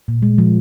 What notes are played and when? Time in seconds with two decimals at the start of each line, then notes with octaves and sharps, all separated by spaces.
0.08 A#2
0.22 G#3
0.38 F3